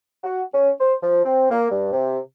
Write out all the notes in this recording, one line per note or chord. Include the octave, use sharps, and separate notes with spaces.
F#4
C#4
C5
F3
C4
A#3
G2
C3